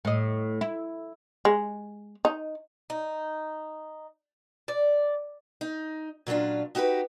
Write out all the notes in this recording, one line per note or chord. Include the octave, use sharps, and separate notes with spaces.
A2 D#5
E4
G#3
D#4
D#4
D5
D#4
A#2 F#3 C#4 D4 F4
D#4 F#4 G4 A4 B4